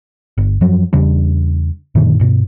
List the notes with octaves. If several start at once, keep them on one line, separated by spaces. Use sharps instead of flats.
G1
F#2 F3 F#3
E2 C#3 G3 D4
F#2 A#2 D3 D#3
G2 B2